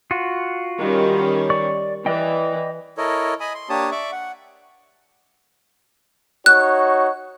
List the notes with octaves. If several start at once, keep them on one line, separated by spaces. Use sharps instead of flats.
F4 F#4
D#3 G3 C#4
D5 C#6
E3 D5 D#5 G5
E4 A4 A#4 C#5 D#5
D#5 G#5 B5 D#6
C6
A#3 D4 G4 C#5 A5 D#6
D5 E5 C#6 D6
F#5
D#4 F#4 C#5 F#6